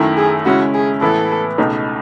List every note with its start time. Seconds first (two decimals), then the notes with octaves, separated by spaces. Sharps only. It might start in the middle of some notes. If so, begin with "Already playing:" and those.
Already playing: F#2 D#3 A3 E4
0.17 G#4
0.45 C#3 G#3 C#4 E4 F#4
0.74 G#4
1.01 A2 E3 B3 E4 A4
1.58 C#2 B2 A3 D#4